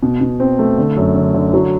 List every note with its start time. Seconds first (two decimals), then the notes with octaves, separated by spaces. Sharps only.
0.03 B2
0.21 B2
0.40 C4
0.59 A3
0.78 D3
0.96 F#2
1.15 D3
1.34 D3
1.53 F#3